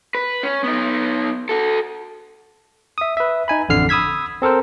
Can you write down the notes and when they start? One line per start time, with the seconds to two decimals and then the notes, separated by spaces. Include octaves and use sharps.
0.15 B4
0.43 C#4
0.64 B3 D#4
1.49 F#4 A4
2.98 E5 D#6
3.17 B4 E5
3.48 D#4 G#5 B5
3.69 A1 F2 D3 F6 C7
3.89 B5 D#6 E6 G#6 B6
4.42 C4 A4 A#4 C5